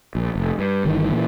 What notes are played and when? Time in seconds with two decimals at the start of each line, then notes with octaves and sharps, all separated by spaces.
0.15 A#1
0.35 F1
0.59 G2
0.85 G1 D#3 E3
1.12 A#2 E3